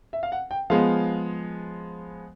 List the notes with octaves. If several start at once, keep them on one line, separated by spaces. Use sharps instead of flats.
E5
F5
F#5
G5
F3 G#3 B3 F5